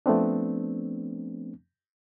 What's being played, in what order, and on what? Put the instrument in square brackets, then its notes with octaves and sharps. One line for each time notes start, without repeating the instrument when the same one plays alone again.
[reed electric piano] F3 A3 B3 C4 D4